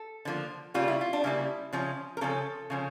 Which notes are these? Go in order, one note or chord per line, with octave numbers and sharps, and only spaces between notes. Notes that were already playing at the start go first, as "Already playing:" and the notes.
Already playing: A4
D3 F3 A#3
C#3 G3 A#3 F4
E4
F4
D4
C#3 G3 A#3 E4
C#3 F3 C#4
A#4
C#3 F3 C#4 A4
C#3 F3 C#4